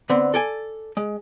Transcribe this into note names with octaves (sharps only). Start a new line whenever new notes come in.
D3 B3 C4
A4 D5 G#5
G#3